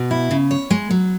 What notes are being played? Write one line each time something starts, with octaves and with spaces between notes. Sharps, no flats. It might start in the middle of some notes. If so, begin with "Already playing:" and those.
Already playing: B2
E4
C#3
C#5
G#3
F#3